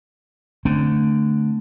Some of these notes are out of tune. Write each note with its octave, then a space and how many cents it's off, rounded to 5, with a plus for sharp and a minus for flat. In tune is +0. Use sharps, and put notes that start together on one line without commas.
D3 +0 A3 +0 C4 +0